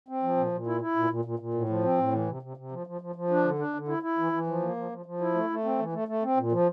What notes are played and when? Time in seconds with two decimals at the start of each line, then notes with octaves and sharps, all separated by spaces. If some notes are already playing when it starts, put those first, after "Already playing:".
0.08 C4
0.23 F3
0.37 A#2
0.52 A#2
0.67 E4
0.81 E4
0.96 A#2
1.10 A#2
1.25 A#2
1.39 A#2
1.54 A2
1.69 F3
1.83 C4
1.98 A2
2.13 E3
2.28 C3
2.42 C3
2.57 C3
2.71 F3
2.87 F3
3.01 F3
3.16 F3
3.30 D4
3.44 D3
3.59 D4
3.74 D3
3.88 E4
4.03 E4
4.18 E3
4.32 E3
4.47 F3
4.62 A#3
4.76 F3
4.91 F3
5.06 F3
5.21 E4
5.34 A3
5.50 A3
5.64 C4
5.79 E3
5.93 A3
6.08 A3
6.23 C4
6.37 A#2
6.52 F3